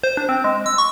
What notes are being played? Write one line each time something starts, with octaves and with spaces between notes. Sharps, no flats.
C5
D4
C4
G#3
E6
C#6